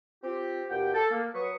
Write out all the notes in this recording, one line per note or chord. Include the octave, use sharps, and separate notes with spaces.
C4 F4 G4
D#2 B2 G4 F#5 G5
A4
A#3
F#3 B4 C#6 D#6